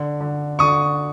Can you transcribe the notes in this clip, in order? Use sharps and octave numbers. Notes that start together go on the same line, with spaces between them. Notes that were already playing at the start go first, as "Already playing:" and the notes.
Already playing: D3
D3
D3 C#6 D#6